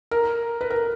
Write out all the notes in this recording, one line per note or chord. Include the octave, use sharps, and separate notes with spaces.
A#4
B4
A#4